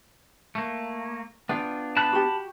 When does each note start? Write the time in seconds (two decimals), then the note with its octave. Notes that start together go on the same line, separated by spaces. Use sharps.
0.55 A3 A#3
1.49 B3 D4 F4 G5
1.97 A5 B5 F#6
2.12 F#4 G4